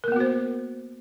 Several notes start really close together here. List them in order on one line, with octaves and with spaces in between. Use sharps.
A#4 A#3 B3 F#4 C5